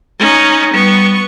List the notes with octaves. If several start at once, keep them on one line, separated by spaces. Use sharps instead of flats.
C#4 D#4
G3 B3 C#6